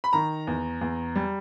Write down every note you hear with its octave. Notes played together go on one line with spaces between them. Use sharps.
B5
D#3 A#5
E2
E2
G3